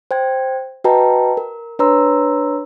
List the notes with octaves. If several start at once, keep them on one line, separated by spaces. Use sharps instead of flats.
C5 G5 G#6
F#4 B4 D#5 G5 A5 A#5
A#4
D4 B4 C#5 A#5 C6 E6